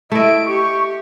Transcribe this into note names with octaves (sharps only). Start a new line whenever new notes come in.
A3 E4 D#5 D7
G4 C#6